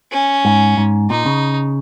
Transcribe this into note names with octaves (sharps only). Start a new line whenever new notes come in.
C#4
G#2
G#2
A#2 D#4
C#3